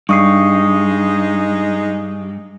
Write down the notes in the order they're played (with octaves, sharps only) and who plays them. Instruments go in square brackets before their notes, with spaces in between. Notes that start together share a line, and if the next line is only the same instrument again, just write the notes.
[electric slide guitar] G2 [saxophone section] G#3 D#4 [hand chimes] C#6 D#6 C7